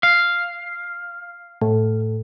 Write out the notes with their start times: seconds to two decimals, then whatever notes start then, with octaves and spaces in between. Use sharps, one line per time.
0.03 F5
1.62 A2